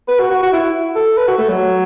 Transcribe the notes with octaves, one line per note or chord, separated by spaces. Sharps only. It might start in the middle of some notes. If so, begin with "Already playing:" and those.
B4
F#4
F#4
F#4
E4
A4
B4
F#4
A3
F#3